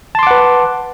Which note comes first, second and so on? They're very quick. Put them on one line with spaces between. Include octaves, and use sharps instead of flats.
A5 C6 D6 F#5 B4